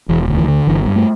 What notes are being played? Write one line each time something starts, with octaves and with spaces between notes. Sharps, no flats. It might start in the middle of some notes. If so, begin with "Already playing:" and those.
E1 E3
D2
E3
D3
G1 E3
G2
A3